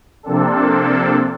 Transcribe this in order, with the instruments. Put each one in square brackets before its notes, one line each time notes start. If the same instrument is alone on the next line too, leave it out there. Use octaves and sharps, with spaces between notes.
[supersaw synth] C3 F3 A#3 C4 D4 A4